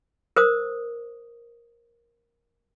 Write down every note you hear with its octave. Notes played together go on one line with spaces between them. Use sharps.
A#4 C5 D#6